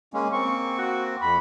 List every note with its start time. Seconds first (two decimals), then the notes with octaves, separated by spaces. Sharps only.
0.13 G#3 A#3 C#4
0.32 A#3 C4 C#6
0.78 F#4
1.22 F2 B5